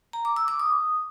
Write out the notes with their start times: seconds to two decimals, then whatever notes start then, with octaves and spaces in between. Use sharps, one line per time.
0.13 A#5
0.25 D6
0.36 E6
0.48 D6
0.60 D#6